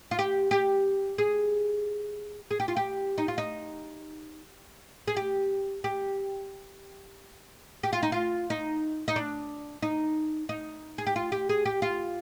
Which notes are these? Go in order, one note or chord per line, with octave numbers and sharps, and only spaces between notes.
F4
G4
G4
G#4
G#4
G4
F4
G4
D#4
F4
D#4
G#4
G4
G4
G4
F4
D#4
F4
D#4
D#4
D4
D#4
D#4
G#4
G4
F4
G4
G#4
G4
F4